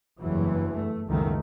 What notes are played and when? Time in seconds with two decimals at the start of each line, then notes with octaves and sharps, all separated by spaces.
0.21 F#1 E2 G2 E3 F#3
0.76 A3
1.07 F#1 C#2 B2 D#3 A3